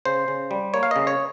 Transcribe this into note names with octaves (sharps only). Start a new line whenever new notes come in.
C#3 C5
C#3
G3
A#3 C#5
F5
C#3 D#5
C#5